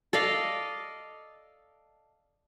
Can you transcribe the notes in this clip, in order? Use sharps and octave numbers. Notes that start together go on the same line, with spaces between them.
A4 D5 D#5 F5